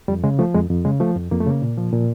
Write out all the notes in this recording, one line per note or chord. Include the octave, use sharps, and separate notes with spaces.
F2 G3
C#3 G#3
F3 A3
F2 G#3
F2
C#3 G#3
F3 A3
F2
F2 A#3
A3
C#3 A#3
A#2
F3
A#2